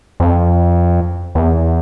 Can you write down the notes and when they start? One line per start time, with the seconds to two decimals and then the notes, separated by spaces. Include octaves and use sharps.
0.20 F2
1.35 E2